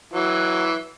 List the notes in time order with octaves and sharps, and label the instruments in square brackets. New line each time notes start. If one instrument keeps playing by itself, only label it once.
[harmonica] E3 F#3